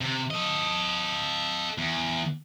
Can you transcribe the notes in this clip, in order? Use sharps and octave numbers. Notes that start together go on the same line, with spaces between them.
C3
A4 D#5
E2